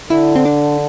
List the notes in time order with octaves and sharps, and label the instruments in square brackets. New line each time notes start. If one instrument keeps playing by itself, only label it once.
[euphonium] D3 [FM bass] E4
[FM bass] C4
D4